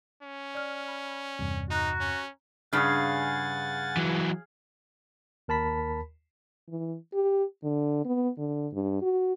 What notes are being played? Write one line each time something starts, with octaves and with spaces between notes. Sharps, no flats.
C#4
D5 F6
B5
E2 G2 C3
D#4 F#4 A#5 F#6
C#4
G2 C#3 G#4 F5 F#5 G#5 A6
E3 F#3
D#2 A#4 A5 B5 B6
E3
G4
D3
B3
D3
G2
F#4